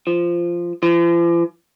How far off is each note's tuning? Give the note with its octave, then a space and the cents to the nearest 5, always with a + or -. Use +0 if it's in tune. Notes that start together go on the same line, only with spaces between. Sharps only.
F3 -10
F3 -45